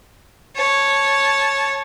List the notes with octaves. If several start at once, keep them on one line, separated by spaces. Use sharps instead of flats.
C#5 A5